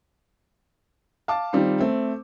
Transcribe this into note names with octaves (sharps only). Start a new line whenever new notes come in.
F5 A5 D6
D#3 G3 C4 D#4 F4
A3 C4